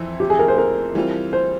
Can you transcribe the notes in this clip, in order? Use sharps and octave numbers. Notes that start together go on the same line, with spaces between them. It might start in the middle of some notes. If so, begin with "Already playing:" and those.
Already playing: F2 E3 C4 E4
G4
G#4
A#4
C5
A#4
E3 G3 C4 F4
C5